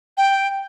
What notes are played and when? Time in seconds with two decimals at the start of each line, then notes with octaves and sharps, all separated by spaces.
0.17 G5